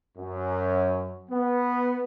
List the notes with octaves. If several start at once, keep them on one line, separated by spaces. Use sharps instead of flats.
F#2
B3